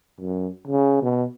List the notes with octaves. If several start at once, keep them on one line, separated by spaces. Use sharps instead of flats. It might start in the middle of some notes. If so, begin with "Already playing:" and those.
F#2
C#3
B2